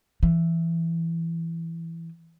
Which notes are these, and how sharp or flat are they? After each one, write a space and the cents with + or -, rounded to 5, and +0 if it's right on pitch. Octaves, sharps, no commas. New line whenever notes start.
E3 +10